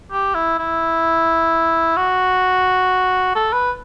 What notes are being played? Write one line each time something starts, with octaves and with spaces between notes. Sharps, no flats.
G4
E4
E4
F#4
A4
B4